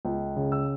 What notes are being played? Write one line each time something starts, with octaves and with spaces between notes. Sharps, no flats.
C#2
C#3
E6